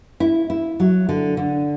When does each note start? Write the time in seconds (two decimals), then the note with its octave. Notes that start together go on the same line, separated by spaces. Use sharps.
0.20 E4
0.50 E4
0.80 F#3
1.09 D3
1.37 D3